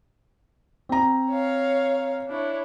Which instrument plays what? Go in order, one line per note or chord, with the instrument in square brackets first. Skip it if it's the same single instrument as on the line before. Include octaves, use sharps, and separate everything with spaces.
[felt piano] C4 A#5
[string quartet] C#5 F5
D4 E4 C#5